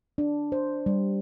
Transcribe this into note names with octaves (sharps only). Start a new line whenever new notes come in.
D4
C5
G3